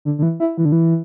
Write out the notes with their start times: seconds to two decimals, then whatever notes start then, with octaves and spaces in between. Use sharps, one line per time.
0.05 D3
0.18 D3
0.23 E3
0.40 E4
0.58 E3
0.65 D3
0.72 E3